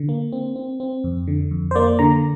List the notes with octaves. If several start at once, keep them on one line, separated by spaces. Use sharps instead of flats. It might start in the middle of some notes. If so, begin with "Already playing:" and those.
Already playing: D3
A#3
C4
C4
C4
F2
D3
F2
C5
A#3 D5
D3 A#5